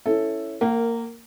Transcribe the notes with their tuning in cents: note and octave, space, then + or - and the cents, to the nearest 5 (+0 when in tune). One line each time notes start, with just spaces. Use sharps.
C#4 +0 E4 +0 A4 +5
A#3 -15 A#4 -5 F#5 +35